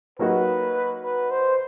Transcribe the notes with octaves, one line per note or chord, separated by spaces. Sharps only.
F#3 A#3 D#4 F#4 B4
B4
C5